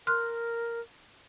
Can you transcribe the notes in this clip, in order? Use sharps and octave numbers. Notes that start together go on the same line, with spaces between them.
A#4 C6 F6 F#6